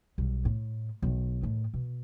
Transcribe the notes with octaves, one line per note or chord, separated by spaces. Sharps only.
B1 G3
A2
B1 D#3
A2 D#3
B2